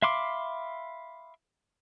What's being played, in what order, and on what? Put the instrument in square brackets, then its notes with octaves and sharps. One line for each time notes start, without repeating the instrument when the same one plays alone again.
[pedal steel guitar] E5 F5 B5 C6 D6